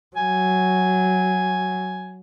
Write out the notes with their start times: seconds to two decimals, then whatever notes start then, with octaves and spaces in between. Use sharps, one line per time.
0.17 F#3 G#5